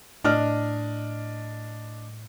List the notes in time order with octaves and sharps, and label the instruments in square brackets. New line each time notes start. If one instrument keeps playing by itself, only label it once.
[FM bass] A2 [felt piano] D4 D#5 F6